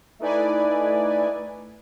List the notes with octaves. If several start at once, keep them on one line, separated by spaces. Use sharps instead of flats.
A3 D#4 E4 B4 D5 G#5